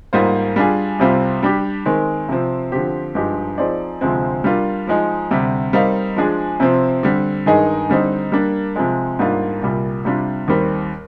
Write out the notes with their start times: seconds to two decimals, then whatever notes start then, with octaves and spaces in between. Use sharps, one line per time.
0.13 G#2 G3 A#3 F4 C5
0.56 G3 D4 F4 G#4
0.99 C2 C3 G3 C4 F4
1.43 G3 D4 G4
1.86 D#3 G#3 C4
2.29 C3 F3 C4
2.72 D3 F3 C4 G4
3.15 G2 F3 G#3 D#4 G4
3.58 F3 C4 D#4 G#4 D5
4.01 D2 C3 F3 G#3 C4
4.44 G3 D4 F4 A#4
4.87 F3 G#3 D#4
5.31 D2 C3 G3
5.73 G3 C4 D#4 A#4 F5
6.16 F3 G#3 D4 G#4
6.60 C3 F3 C4
7.03 D3 G3 C4
7.46 G2 D#3 G#3 D#4 G#4
7.89 D3 G3 C4 D#4
8.32 G3 A#3 D4
8.76 C3 F3 G#3
9.19 G#2 G3 A#3 D4 F4
9.62 C2 A#2 G3
10.05 C3 G3 D4 F4
10.48 D#2 D#3 G3 C4